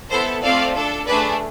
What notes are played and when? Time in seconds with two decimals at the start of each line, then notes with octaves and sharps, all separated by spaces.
0.11 B3 E4 A4 C5
0.42 A3 C4 F4 A4 D5 F5
0.74 D4 A4
1.06 A3 D4 G#4 B4 D5